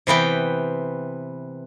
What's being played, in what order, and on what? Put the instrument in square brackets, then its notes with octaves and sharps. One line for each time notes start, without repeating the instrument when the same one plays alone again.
[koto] C3 E3 B3 G5